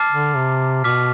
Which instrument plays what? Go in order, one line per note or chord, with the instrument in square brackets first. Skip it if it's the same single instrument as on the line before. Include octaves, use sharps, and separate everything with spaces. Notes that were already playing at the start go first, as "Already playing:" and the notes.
Already playing: [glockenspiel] A5 D6 F6 A6 C7
[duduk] D3
C3
[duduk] B2 [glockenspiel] D6 F6 B6